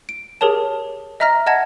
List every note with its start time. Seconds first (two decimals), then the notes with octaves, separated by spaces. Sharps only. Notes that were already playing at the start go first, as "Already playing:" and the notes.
0.09 D7
0.41 G4 G#4 A#4 C#5 A5
1.20 D#5 E5 A#5 F6 A#6
1.46 D#5 F#5 A5 G#6 A#6